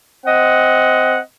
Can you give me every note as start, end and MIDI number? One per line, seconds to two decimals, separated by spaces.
0.25 1.19 60
0.25 1.19 75
0.25 1.19 78